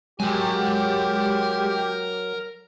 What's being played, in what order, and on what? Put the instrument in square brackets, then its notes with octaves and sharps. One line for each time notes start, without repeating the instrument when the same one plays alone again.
[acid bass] F#3 [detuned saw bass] G#3 [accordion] G4 [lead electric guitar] A#4 G#5